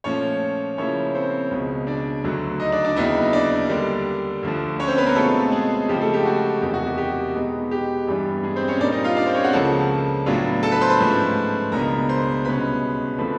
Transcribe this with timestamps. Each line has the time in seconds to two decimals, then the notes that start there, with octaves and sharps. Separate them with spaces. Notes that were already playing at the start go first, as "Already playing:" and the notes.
0.04 A#2 F3 A3 C#4 C#5
0.78 C#3 F3 A#3 C#4 E4 C#5
1.15 C4 C5
1.51 C#2 B2 G#3
1.87 D4 D5
2.24 D2 D3 F#3
2.60 D#4 D#5
2.72 D4 D5
2.84 D4 D5
2.96 D#2 C#3 F#3 B3 D#4 E4 D#5
3.33 D4 D5
3.69 D3 G3 A#3
4.43 D2 D3 F3
4.80 C#4 C#5
4.88 C4 C5
4.97 B3 B4
5.06 A#3 A#4
5.15 B2 G#3 A3 C4 F4 A4
5.52 G#3 G#4
5.88 C#3 F3 G#3 G4
6.01 A3 A4
6.14 G4
6.25 F#4
6.61 E2 C3 D#3 G4
6.74 F#4
6.86 G4
6.98 G4
7.35 B2 G#3 B3 D#4
7.71 G4
8.07 G2 E3 G3 B3 D4
8.43 G#3 G#4
8.56 C4 C5
8.68 C#4 C#5
8.80 A#2 G3 A#3 D4 D#4 D5
8.92 D#4 D#5
9.04 F4 F5
9.17 D4 D5
9.25 C4 C5
9.35 C#4 C#5
9.44 F#4 F#5
9.53 C#2 C#3 F3 A#3 A4 A5
10.26 A2 F#3 B3 D4 F4
10.63 A4 A5
10.71 B4 B5
10.81 C5 C6
10.90 B4 B5
10.99 G#2 F3 A3 C#4
11.72 C#2 B2 G#3 B3 D4 A#4 A#5
12.09 C5 C6
12.45 C2 B2 G#3 C#4 B4 B5
13.18 D3 F3 A3 C4 B4 B5